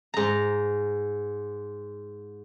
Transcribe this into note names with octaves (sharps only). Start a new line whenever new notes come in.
G#2 A#5